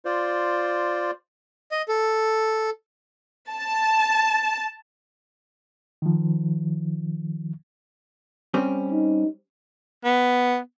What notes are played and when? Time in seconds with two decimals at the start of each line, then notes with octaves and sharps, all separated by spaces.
0.05 F4 C5 D5
1.71 D#5
1.88 A4
3.49 A5
6.02 D#3 F3
8.54 G3 C4 C#4
8.92 D#4
10.05 B3